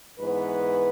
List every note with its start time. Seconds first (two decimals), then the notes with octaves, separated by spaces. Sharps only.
0.19 G#2 E3 B3 B4